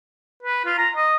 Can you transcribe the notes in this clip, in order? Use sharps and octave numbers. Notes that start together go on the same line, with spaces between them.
B4
F4
A#5
D#5